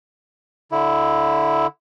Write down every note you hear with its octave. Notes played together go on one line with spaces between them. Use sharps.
D3 E4